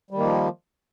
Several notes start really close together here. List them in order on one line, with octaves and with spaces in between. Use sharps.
G3 D#3 A#3 F3